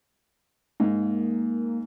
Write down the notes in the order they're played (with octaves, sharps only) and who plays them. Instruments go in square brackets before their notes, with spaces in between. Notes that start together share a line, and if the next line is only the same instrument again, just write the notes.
[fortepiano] G#2 [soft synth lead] A#3